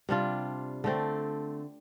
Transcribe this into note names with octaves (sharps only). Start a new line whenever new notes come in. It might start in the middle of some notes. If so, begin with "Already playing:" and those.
C3 G3 D4 F4
D3 A3 C4